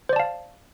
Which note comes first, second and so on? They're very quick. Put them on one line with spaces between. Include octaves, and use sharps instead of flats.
C5 D5 A5 F5